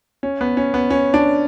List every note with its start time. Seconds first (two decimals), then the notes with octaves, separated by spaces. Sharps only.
0.23 C#4
0.41 B3
0.57 C#4
0.74 B3
0.90 C#4
1.14 D4